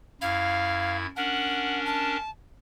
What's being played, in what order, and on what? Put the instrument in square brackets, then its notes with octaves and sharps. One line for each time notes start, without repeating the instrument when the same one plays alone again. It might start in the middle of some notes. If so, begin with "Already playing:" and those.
[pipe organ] F#2 E4 G#6 [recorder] F5
[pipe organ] C#4 D4 A#4 [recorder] F#5
[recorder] A5